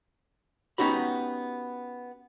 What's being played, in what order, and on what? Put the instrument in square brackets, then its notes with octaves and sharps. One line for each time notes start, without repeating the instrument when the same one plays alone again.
[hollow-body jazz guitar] B3 C#4 D#4 F#4 G4 B5